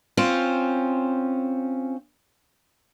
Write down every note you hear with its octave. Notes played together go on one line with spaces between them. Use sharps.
C4 C#4 F4